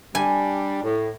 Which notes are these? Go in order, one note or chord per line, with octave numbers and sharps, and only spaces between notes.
G3 D4 G#5
A2